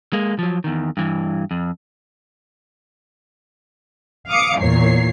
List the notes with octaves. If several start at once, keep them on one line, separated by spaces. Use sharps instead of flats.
G#3 A#3
F3 F#3
E2 D#3
G2 E3
F2
F5 D6 D#6 C#7
E2 A#2 C#5 C7